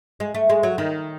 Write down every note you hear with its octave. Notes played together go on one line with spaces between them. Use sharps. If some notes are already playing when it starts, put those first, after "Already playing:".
G#3
A3
G#3
F#3
D#3